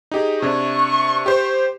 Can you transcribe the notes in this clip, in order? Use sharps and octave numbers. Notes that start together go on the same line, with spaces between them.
D#4 G4 G#4
C3 D4 C#6 G#6
G4 C5